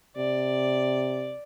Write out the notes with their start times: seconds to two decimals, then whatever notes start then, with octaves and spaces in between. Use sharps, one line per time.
0.17 C3 D5